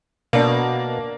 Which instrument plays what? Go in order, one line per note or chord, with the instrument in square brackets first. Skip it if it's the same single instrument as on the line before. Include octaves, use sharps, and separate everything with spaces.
[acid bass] B2 [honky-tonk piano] A#3 D4